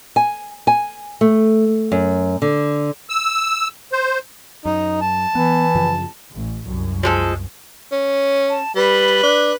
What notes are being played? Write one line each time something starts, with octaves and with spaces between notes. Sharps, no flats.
G#5
G#5
A3
F#2
D3
E6
C5
F#2 D#4
A5
E3 B3
F#2 C#3 F3
A1
C2 F#2
F3 G#3 A4
C#4
A5
G3 B4
D4